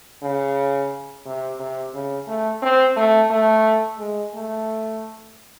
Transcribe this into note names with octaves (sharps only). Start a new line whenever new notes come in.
C#3
C3
C3
C#3
A3
C4
A3
A3
G#3
A3